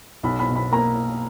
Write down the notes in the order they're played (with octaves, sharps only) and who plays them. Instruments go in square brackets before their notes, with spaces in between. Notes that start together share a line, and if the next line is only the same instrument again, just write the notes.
[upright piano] B1 B5
B5
B2
B5
A#3 A#5